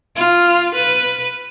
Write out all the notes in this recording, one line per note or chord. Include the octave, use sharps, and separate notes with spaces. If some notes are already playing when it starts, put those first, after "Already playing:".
F4
B4